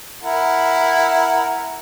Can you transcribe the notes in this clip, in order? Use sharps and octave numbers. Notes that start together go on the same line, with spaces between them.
E4 A#4 F#5